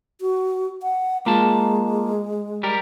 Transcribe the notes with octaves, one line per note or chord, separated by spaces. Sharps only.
F#4
F#5
G#3 A#3 F4 A5
G3 G4 A#4